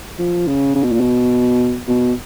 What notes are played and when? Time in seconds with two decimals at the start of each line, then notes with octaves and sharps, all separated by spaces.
0.19 F3
0.47 C#3
0.75 C#3
0.83 B2
0.92 A#2
1.00 B2
1.88 B2